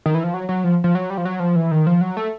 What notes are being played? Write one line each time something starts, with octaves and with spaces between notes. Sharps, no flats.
D#3
E3
F3
F#3
F#3
F3
F3
F#3
G3
F3
F#3
F3
E3
D#3
F3
F#3
A3